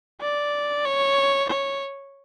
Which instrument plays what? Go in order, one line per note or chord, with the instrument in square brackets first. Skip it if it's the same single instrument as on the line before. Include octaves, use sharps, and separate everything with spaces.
[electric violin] D5
C#5
C#5